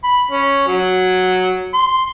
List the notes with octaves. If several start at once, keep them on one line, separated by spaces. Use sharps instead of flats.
B5
C#4
F#3
C6